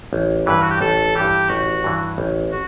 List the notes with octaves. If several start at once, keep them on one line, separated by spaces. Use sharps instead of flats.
A1
G2 E3 B4
F#4
G4
A1 A4
G2 E3 G4
A1 F#4
G2 E3
A1
F#4